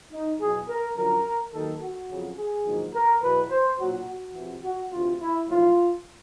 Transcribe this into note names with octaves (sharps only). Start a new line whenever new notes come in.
D#4
E2 B2 F#3 G#4
A#4
F#2 D3 F3 A#4
D#2 D#3 F#3 A4
F#4
F2 C#3 F#3
G#4
A#1 G#2 D#3 F#3
A#4
E2 B2 F#3 B4
C5
B1 A#2 F#3 F#4
F#4
F2 C3 E3
F#4
D2 C3 E3 F4
E4
B1 A2 F3 F4